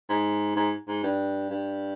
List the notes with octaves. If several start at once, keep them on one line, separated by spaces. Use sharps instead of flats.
G#2
G#2
G#2
G2
G2